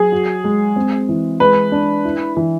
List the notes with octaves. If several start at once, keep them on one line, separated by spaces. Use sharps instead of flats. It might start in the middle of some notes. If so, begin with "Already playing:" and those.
Already playing: F#3 G#4
F#4
G#3
C4
E3
G#3 B4
D4
E4
E3